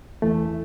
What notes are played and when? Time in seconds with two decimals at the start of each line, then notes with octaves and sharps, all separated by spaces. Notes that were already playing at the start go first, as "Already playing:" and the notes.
0.22 E2 E3 A3